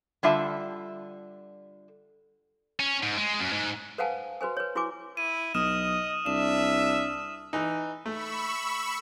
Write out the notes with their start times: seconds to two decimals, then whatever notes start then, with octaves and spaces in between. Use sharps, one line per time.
0.23 D3 G3 F4 E5 A5
2.79 C#4
3.03 G#2
3.17 G#3
3.39 F#2
3.53 G#2
3.98 B4 C5 F5 F#5 G#5 A5
4.41 F#4 B4 C5 G#5
4.57 B4 C#5
4.75 E4 F#4 B4 G#5 D6
5.17 E4 D#7
5.54 B1 D#5 D#6 F6 E7
6.26 C2 D4 E5 E7
7.53 E3 D#4
8.06 A3 B5 C#6 E6